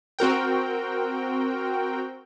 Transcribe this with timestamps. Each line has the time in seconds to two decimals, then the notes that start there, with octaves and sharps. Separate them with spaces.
0.19 C4 F#4 A#4 G5